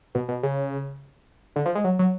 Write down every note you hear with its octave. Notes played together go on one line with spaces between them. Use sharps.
B2
B2
C#3
D3
F3
G#3
F#3
F#3